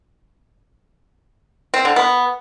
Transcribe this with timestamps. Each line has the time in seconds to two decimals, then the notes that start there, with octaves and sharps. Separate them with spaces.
1.74 C4
1.85 D3
1.96 B3